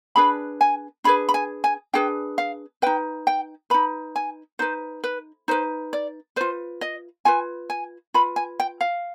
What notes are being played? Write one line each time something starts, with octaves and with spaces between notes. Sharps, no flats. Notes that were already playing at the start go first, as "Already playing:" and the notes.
D4 G#4 B4 B5
G#5
D4 G#4 B4 B5
B5
G#5
G#5
D4 G#4 B4 G5
F5
D#4 B4 G5
G5
D#4 B4 B5
G#5
D#4 B4 C5
B4
D#4 B4 C5
D5
F4 B4 C5
D#5
F4 B4 G#5
G#5
F4 B4 B5
G#5
G5
F5